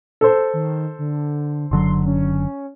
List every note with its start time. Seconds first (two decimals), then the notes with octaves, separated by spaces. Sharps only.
0.21 A4 C5
0.53 D#3
0.99 D3
1.71 F#1 D3 F#3 C6
2.05 C#4